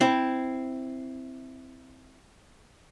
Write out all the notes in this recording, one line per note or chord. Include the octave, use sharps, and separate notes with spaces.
C4 E4